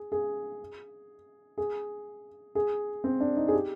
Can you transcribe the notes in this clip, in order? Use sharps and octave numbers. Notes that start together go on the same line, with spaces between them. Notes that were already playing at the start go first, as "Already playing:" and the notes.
Already playing: G#4
G#4
G#4
G#4
C4
D4
D#4
G#4
G4